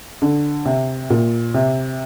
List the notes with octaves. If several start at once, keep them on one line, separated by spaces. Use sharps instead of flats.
D3
C3
A#2
C3